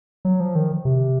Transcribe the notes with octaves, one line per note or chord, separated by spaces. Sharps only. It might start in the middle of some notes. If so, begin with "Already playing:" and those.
F#3
F3
D#3
C3